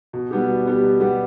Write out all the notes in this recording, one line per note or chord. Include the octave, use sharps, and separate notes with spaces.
B2
G3 B3 G4
B2
G3 B3 G4
B2
G3 B3 G4